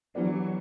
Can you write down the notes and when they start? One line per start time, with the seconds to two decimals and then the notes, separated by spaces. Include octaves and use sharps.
0.15 E3 F#3 G3 B3 D4